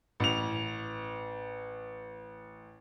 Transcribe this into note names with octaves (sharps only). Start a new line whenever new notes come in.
A1 F7